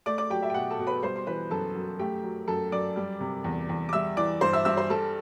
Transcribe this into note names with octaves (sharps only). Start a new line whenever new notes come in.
A3 D5 D6
D5 D6
F#3 G4 G5
E5
G5
B2 F#5
A4 A5
B2
B4 B5
G3 C5 C6
C6
E3 B4 B5
F#2 A4 A5
F#2
A3 G4 G5
F#3
F#2 A4 A5
F#2 D5 D6
G3
C3
E2
E2
D6
G3 E5 E6
E3 D5 D6
G2 C5 C6
E5 E6
G2 E5 E6
C5 C6
G3 A4 A5